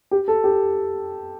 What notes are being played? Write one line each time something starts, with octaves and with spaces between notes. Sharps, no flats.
G4
A4
G4